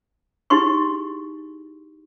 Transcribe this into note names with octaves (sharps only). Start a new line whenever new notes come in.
D#4 E4 G4 G#4 C6 C#6